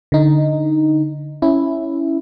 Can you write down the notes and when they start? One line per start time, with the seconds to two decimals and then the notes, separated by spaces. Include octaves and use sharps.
0.12 D3 D#4
1.42 C#4 E4